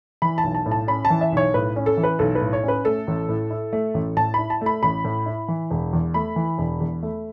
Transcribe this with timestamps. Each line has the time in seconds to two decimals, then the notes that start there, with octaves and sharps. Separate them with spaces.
0.22 E3 B5
0.38 A5
0.44 B1
0.55 A5
0.66 A2
0.71 A5
0.87 C#4 B5
1.05 A5
1.10 E3
1.21 E5
1.32 B1 C#5
1.54 A2 B4
1.76 C#4
1.86 A4
1.97 E3
2.03 B4
2.19 B1 A4
2.35 B4
2.41 A2
2.53 C#5
2.64 C#4 B4
2.85 A3 A4
3.08 A1
3.29 A2
3.50 E4
3.73 A3
3.94 A1
4.17 A2 A5
4.34 E4 B5
4.50 A5
4.61 A3
4.66 B5
4.83 A1 B5
5.04 A2
5.26 E4
5.48 E3
5.70 E1
5.93 E2
6.14 A3 B5
6.36 E3
6.58 E1
6.80 E2
7.03 A3